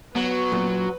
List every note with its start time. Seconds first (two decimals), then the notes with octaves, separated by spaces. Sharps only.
0.16 F#3 B3 B4
0.52 F#2 A#2